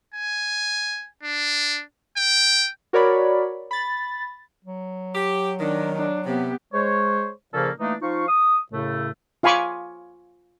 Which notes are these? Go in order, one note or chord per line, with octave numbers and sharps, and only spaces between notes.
G#5
D4
G5
F#4 A#4 C#5 D5 B5
B5 A6
F#3
G4
D#3 D4
D4
C3 B3 G4
G#3 C5 C#5
A#2 C#3 F3 A#3 C#4 A4
E3 A3 A#3 D4 D#4
F3 D#4 F4 F5 C#6
D#6
F#2 A2 C#3 A3
F4 F5 G#5 B5 C#6 D6